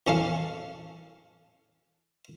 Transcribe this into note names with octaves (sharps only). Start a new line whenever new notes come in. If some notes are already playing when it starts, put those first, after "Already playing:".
E2 C#4 A4 F5